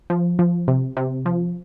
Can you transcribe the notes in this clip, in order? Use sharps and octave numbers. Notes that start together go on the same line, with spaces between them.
F3
F3
C3
C3
F3